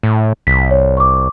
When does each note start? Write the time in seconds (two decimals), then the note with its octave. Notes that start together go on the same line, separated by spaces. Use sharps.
0.03 A2
0.47 C2 B6
0.71 C#5
0.97 C#6 D6